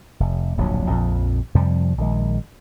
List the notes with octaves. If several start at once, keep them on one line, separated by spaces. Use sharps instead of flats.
F1
D1 A#1 F2 F#3
A#1 F2
F2 C3 F3 G3
A#1 D#3 G#3